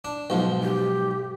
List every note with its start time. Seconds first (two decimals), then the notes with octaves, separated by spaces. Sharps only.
0.05 D4
0.30 B1 G#2 F3
0.63 G4